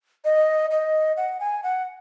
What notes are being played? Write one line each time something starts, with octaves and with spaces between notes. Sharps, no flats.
D#5
D#5
F#5
G#5
F#5